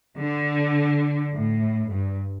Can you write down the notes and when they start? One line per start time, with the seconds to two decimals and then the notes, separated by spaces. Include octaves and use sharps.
0.18 D3
1.32 A2
1.89 G2